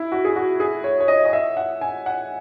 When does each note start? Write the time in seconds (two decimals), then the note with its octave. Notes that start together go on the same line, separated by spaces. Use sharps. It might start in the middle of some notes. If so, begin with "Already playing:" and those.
Already playing: E4
0.12 F#4
0.25 G#4
0.36 F#4
0.60 G#4
0.84 C#5
1.00 C#5
1.08 D#5
1.25 D#5
1.33 E5
1.57 F#5
1.81 G#5
2.06 F#5